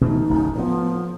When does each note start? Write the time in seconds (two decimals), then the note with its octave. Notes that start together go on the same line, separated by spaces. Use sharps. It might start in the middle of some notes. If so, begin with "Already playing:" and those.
0.01 B2 E3 A3 D#4
0.30 D1 A1 F2
0.55 A2 F3 B3